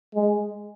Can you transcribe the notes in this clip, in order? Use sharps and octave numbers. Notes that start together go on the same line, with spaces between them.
G#3